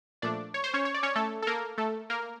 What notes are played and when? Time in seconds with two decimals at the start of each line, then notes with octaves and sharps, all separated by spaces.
0.22 A#2 F3 A3 D4 D5
0.54 C#5
0.64 C5
0.74 C#4 C#5
0.85 C#5
0.94 D5
1.03 C#4 C#5
1.16 A3 A4
1.42 A4
1.47 A#3 A#4
1.78 A3 A4
2.10 A#3 A#4